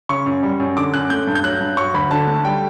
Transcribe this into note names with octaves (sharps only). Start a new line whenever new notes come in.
C#3 C#6
F#2
G3
F#2
D3 D6
F#2 F#6
A3 G6
G2
G6
F#3 F#6
G2
F#3 C#6
D2 B5
D3 A5
A3
G3 G5